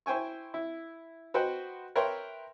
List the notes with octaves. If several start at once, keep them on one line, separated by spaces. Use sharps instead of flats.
E4 C5 G5 G#5 C#6
E4
F#4 B4 C5 D#5 F#5 G5
A#4 B4 C#5 E5 G5 C6